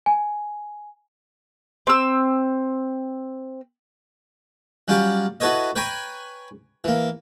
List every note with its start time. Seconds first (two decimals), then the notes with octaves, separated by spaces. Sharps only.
0.06 G#5
1.87 C4 E6
4.88 F#3 G3 C#4 F4 G4
5.40 E4 F#4 A4 B4 C#5 D#5
5.76 B4 C#5 G5 G#5 A#5 B5
6.84 E3 A#3